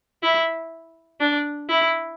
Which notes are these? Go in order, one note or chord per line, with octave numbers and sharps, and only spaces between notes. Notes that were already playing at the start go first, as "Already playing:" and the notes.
E4
D4
E4